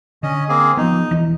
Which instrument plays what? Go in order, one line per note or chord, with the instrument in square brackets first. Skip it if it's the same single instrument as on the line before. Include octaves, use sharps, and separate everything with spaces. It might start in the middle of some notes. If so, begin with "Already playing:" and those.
[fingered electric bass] D3 [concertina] C#4 D#5
[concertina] A#3 C4 G#4
[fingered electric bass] F3 B3 [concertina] D#4
[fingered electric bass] E1 E3